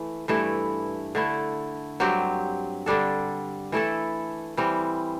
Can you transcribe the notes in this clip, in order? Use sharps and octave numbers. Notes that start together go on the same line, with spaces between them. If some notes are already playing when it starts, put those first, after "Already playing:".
Already playing: E3 A3
G2 E3 A3 E4
D3 A3 E4
G2 F#3 C4 G4
D3 G3 D4 A4
E3 A3 E4 A4
E3 G3 C4